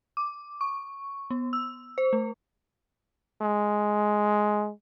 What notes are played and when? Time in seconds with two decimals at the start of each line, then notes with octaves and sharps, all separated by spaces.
0.17 D6
0.61 C#6
1.30 B3
1.53 E6
1.98 C5
2.13 A3
3.41 G#3